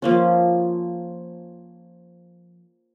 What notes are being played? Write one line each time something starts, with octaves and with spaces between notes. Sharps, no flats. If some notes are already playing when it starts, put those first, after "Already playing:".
F3 A#3 C#4